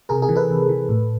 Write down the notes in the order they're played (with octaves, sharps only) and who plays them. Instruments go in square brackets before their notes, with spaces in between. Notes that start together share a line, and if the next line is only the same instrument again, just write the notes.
[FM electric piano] C3 G#4 A#4
G#4 A#4
E3
A4 B4
C3
E3
A2